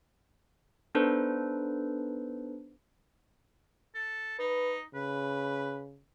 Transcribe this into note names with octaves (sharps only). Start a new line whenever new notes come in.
B3 D4 D#4 A4 B4 C5
A4
D#4 B4
C#3 B4